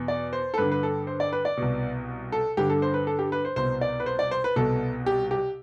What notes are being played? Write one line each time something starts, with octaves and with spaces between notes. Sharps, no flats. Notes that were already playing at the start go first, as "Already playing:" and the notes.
Already playing: E2 B2
D5
C5
A4
G2 D3 B4
B4
A4
C5
D5
B4
D5
C2 B2
A4
G2 D3 G4
A4
C5
B4
A4
G4
B4
C5
C2 B2 C5
D5
B4
C5
D5
C5
B4
C2 B2 A4
G4
G4